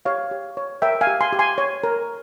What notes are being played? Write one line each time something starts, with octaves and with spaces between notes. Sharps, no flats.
G4 C#5 F5
G4
C#5
A#4 E5 G5
F5 G#5
G4
G#5 C6
G4
G#5 C6
C#5
A#4